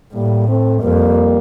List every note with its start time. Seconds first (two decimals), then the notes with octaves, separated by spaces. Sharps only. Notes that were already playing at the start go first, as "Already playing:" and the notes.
0.13 A2 G3 A#3
0.47 A3 C4
0.82 F2 G3 A#3